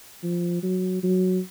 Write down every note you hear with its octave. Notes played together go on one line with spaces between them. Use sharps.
F3
F#3
F#3